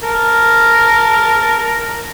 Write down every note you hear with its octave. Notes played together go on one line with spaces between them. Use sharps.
A#4 A5